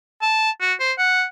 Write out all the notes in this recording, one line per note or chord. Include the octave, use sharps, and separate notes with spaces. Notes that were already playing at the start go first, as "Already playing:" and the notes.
A5
F#4
C5
F#5